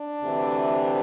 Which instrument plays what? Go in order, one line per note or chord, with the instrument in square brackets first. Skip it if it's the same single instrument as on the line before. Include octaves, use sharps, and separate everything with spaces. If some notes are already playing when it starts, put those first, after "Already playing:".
Already playing: [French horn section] D4
D2 C3 E3